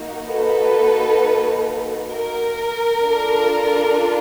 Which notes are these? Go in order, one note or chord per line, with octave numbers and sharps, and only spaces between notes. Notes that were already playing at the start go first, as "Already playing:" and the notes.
Already playing: A#3 D#4 F#4
A4 B4
A#4
D4 F4 A4